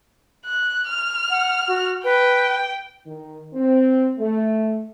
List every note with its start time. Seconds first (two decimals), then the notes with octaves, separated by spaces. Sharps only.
0.45 F#6
0.88 F6
1.30 F#5
1.68 F#4
2.04 B4 G5
3.06 D#3
3.53 C4
4.19 A3